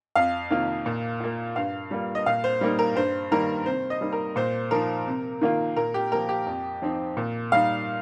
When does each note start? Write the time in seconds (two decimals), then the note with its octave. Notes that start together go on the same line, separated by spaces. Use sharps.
0.15 F2 F5
0.50 C3 D#3 A#3 F4
0.86 A#2
1.20 A#3 F4
1.56 G2 F5
1.91 G3 A#3 F4
2.15 D#5
2.26 A#2 F5
2.44 C5
2.61 G3 A#3 D#4
2.79 A#4
2.96 G2 C5
3.31 D#3 G3 A#3 A#4
3.66 C3 C5
3.90 D#5
4.01 G3 A#3 D#4
4.12 A#4
4.36 A#2 C5
4.71 F3 D#4 A#4
5.07 C3
5.41 D#3 A#3 F4
5.76 A#2 A#4
5.94 G4
6.11 F3 A#3 A#4
6.29 G4
6.47 F2
6.82 F3 C4 D#4
7.17 A#2
7.52 G3 D#4 F5